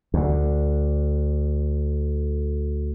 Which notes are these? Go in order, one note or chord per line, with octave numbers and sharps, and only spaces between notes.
D2 D3